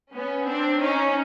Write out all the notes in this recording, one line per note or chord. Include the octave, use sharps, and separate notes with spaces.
B3 C#4
C4 D4
C#4 D#4